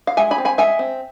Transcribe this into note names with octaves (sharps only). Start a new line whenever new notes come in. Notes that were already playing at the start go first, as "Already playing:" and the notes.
F5
G#3 E5 G#5
G#5 B5
C4
G#5 B5
G#3 E5 G#5
C4